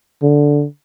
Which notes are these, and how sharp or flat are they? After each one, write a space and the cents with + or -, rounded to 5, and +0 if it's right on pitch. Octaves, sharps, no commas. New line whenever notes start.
D3 -5